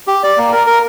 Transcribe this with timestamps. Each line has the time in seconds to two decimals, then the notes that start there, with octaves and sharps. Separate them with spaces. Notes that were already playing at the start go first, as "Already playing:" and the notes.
0.07 G4
0.23 D5
0.38 A#3
0.52 A#4
0.67 A#4